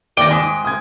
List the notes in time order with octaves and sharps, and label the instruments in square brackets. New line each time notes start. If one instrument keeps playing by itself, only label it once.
[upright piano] D#2 A#6 [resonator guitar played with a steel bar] D5 [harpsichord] G5
[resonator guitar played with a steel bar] G#2 [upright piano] G#5 D#6
[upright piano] D#6 G#6